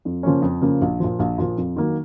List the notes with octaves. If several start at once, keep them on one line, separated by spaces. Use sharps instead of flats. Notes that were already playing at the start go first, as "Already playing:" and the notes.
F2
C#3 F3 A#3 C#4
F2
C#3 F3 A#3 C#4
A#1
A#2 F3
A#1
A#2 F3
F2
D#3 F#3 A#3